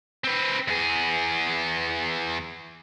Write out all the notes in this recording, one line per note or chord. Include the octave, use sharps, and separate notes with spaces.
C4 B4
E2 G#4